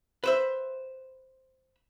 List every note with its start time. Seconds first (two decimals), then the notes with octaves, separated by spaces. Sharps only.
0.24 B4 C5 E5